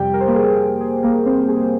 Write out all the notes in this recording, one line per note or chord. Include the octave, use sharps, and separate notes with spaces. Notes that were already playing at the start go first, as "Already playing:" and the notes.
Already playing: F2 C3 G3 G4 G5
A#4
C5
A#3 A#4
G#4
G#4
A#3 A#4
C4 C5
G#4